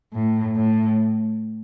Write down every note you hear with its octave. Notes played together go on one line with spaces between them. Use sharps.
A2
A2